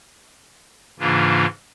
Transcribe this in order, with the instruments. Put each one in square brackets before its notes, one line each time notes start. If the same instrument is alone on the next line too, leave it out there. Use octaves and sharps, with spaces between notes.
[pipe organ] G#2 C#3 E3 A#3 D4 F4